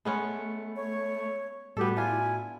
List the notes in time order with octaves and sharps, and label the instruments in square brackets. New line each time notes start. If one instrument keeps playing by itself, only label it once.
[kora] G#3 B3 C#4 [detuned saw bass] A3 [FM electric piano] B5 C#7
[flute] C#5
[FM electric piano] A2 F#4 [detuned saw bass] G3 [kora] B3 A4 [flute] G4
[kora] D4 F4 [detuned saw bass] E4 [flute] G#5